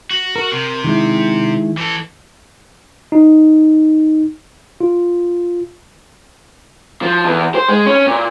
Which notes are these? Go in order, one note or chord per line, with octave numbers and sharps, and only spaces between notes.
F#4
A#4
C3
D#3 G#3 E4
E3 A4
D#4
F4
F3
E2
C5
G#3
C#4
A#2